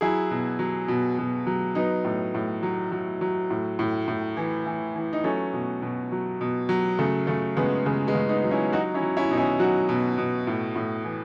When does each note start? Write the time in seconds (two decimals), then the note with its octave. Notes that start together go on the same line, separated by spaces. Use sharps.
0.01 F#3 E4 G#4
0.31 B2
0.59 F#3
0.88 B2
1.18 B2
1.47 F#3
1.75 F#3 B3 D#4
2.05 A2
2.34 A2
2.63 F#3
2.92 F#3
3.21 F#3
3.50 A2
3.79 A2
4.08 A2
4.37 E3
4.66 E3
4.96 E3
5.13 D#4
5.24 F#3 A3 C#4
5.53 B2
5.82 B2
6.12 F#3
6.41 B2
6.69 F#3
6.99 C#3 A3
7.27 C#3 A3
7.57 C#3 G#3 B3
7.86 C#3 G#3 B3
8.07 G#3 B3
8.15 C#3
8.29 B3 D#4
8.44 F#3
8.51 C#4 E4
8.73 F#3 D#4 F#4
8.94 C#4 E4
9.02 F#3
9.17 C#4 E4
9.30 B2 D#4
9.37 C#4 E4
9.59 F#3 D#4 F#4
9.89 B2
10.18 B2
10.47 A2
10.76 A2
11.04 E3